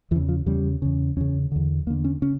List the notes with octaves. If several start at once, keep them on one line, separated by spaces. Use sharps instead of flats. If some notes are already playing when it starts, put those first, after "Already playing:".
E2 C#3 E3
F3
E2 C#3 G3
E2 C#3
E2 C#3 C#4
E2 D3
E2 D3 A#3
C#4
C#3 C#4